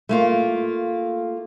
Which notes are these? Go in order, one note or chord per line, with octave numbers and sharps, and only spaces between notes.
A3 A#3 F4